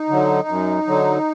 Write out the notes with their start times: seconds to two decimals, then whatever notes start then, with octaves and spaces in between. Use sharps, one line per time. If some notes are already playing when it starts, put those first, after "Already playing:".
Already playing: D#4
0.09 D3 F#3
0.48 F#2
0.87 D3 F#3